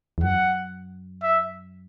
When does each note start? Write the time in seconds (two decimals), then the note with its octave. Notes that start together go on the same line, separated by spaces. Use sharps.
0.18 E2
0.23 F#2 F#5
1.23 E5